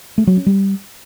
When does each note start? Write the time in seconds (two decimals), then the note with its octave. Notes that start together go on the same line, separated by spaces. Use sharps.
0.18 A3
0.27 F#3
0.37 C#4
0.46 G3